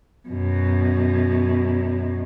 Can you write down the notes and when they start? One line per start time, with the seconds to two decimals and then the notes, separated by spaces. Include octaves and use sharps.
0.28 F#2 B2